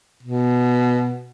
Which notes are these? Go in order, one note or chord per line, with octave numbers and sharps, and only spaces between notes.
B2